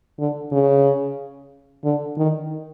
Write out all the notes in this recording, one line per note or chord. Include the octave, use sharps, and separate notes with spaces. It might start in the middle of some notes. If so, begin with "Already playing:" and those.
D3
C#3
D3
D#3